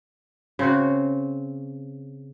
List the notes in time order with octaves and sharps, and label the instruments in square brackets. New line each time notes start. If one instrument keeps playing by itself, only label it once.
[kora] C#3 C4 F#4